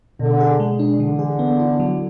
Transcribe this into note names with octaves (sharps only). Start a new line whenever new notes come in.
B2 D3
G#4
G#3
D4
D3 E3
G#4
B3
E4
F#3